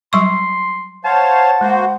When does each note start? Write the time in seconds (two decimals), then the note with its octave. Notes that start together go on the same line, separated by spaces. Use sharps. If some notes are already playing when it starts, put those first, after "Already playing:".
0.13 F#3 G3 C6 C#6
1.05 C5 C#5 F5 F#5 A5
1.61 G#3 A#3 F#4 C5